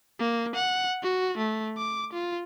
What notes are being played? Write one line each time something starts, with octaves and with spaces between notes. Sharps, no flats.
A#3
F#5
F#4
A3
D6
F4